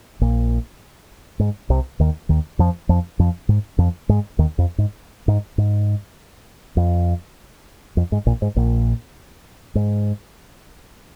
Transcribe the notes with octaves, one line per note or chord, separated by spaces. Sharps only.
A#1 A#2
G#2
C2 C3
D#2 D#3
D#2 D#3
F2 F3
F2 F3
F2 F3
G#2
F2 F3
G#2 G#3
D#2 D#3
F2
G#2
G#2
G#2
F2
F2
G#2
A#1 A#2
G#2
A#1 A#2
G#2